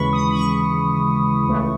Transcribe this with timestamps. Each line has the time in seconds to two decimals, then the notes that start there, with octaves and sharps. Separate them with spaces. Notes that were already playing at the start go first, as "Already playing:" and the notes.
Already playing: D#2 C#3 E3 G#3 B5 C#6
0.13 D#6
0.29 B5
0.35 C#6
1.48 C#2 C#3 E3 A3